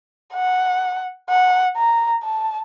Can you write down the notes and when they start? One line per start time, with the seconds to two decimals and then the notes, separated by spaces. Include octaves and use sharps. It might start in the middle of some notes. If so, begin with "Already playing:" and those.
0.34 F#5
1.29 F#5
1.77 A#5
2.24 A5